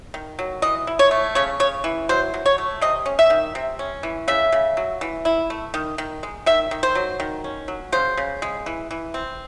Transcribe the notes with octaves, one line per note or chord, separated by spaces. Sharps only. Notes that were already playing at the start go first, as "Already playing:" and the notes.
D#3
F#3
E3 D#5
E4
C#5
A3
C#3 C#5
C#3 C#5
E3
F#3 C5
F#3
C#5
A3
C3 D#5
C#4
E5
D#3
C3
C#4
E3
C#3 E5
C#3
F#3
E3
E4
A3
D#3
D#3
G#3
D#3 E5
D#3
C5
F#3
D#3
C#4
F#3
C#3 C5
C#3
G#3
E3
E3
C4